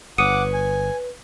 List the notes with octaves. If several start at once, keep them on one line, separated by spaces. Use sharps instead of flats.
G1 B4 C#5 F#5 D6 D#6 C#7 D#7
G#5